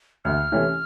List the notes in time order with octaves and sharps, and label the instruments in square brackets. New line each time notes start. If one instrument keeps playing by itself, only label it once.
[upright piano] D2 [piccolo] F6
[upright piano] C3 E3 A3 C#4